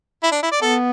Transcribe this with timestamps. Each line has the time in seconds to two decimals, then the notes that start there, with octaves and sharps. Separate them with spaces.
0.23 E4
0.32 D4
0.42 E4
0.52 D5
0.61 B3 A4